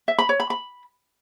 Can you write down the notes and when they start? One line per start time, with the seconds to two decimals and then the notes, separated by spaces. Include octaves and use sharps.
0.08 E5
0.18 B5
0.29 C#5
0.40 B5
0.50 B5